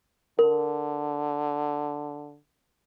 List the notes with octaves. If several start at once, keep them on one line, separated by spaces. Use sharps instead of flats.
D3 A#4